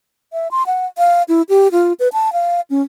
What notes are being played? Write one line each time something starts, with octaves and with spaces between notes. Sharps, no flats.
E5
C6
F#5
F5
E4
G4
F4
B4
A5
F5
C#4